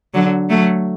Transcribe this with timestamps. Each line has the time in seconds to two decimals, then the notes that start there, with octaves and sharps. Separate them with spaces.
0.14 D3 F#3
0.49 F#3 A3